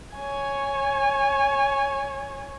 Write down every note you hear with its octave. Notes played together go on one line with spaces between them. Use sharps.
C#5 G#5